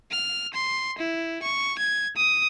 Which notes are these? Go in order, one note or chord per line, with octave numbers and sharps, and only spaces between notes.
F6
C6
E4
C#6
G#6
D#6